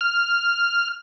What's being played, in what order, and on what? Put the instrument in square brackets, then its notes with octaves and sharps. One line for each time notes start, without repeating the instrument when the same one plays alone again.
[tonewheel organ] F6